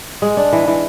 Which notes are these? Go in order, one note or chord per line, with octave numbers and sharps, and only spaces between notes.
G#3
D4
E3
E3